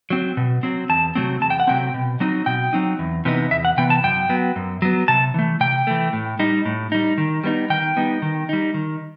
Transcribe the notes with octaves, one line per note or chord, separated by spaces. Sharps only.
F#3 C4
B2
F#3 C4
E2 A5
C3 F#3 A3 C4
E2 A5
G5
F#5
C3 F#3 A3 C4 G5
B2
F#3 C4 D#4
B2 G5
F#3 C4 D#4
E2
C3 E3 B3 D#4
E2 E5
F#5
C3 E3 B3 G5
A5
F#2 G5
F#3 B3
F#2
F#3 B3
C3 A5
E3 A3
C3 G5
E3 A3
A2
G3 D#4
A2
G3 D#4
D#3
G3 B3 D#4
D#3 G5
G3 B3 D#4
D#3
G3 D#4
D#3